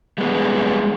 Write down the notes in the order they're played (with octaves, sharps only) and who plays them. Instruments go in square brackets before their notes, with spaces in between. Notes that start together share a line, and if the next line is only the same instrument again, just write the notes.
[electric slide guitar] G3 G#3 B3